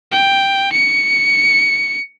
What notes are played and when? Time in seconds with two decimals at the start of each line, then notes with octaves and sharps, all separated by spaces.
0.12 G5
0.72 C#7